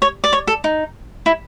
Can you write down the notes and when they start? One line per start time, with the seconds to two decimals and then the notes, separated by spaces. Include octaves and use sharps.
0.02 C#5
0.24 D5
0.33 C#5
0.47 A4
0.64 D#4
1.26 E4